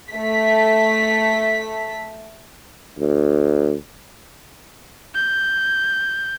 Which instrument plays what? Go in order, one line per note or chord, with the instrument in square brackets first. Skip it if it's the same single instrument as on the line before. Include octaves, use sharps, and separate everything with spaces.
[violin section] A3 B6
[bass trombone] D2
[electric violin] G6